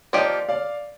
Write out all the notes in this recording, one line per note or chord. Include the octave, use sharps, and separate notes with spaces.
F3 A#3 D#4 G4 D5 F5
D5 F5